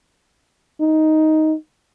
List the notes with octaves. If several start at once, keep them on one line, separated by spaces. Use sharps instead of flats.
D#4